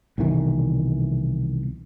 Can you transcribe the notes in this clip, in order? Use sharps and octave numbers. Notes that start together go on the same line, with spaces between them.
C2 B2 D#3 E3